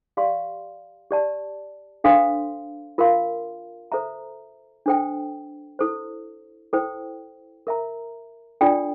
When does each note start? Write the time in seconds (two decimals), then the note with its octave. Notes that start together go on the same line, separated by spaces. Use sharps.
0.17 G4 D5 F5 C6
1.11 G4 D5 A5
2.04 D4 A4 C5 F5 C6
2.98 F4 A#4 F5 C6
3.92 A4 C5 E5 A#5
4.86 D4 A4 C5 G5
5.79 E4 A4 C5
6.73 E4 A4 C5 G5
7.67 A#4 E5 A#5
8.61 D4 F4 A4 D5 G5